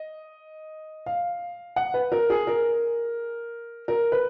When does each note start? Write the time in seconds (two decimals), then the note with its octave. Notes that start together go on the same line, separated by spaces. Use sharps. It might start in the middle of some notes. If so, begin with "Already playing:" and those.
Already playing: D#5
1.06 F5
1.76 F#5
1.94 B4
2.12 A#4
2.30 G#4
2.47 A#4
3.88 A#4
4.12 B4